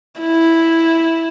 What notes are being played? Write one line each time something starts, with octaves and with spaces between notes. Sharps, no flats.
E4